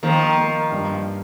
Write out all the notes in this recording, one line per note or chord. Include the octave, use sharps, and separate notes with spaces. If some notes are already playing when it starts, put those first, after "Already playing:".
D#3 F3 A#3
A#3
G2